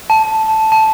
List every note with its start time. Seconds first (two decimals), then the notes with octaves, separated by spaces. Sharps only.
0.10 A5
0.72 A5